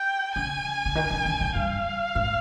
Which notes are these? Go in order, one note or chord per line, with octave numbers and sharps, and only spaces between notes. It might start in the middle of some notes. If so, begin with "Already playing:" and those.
Already playing: G5
C#3 G#5
C#3
D#3
C#3
D#3
C3
G2 F5
G#2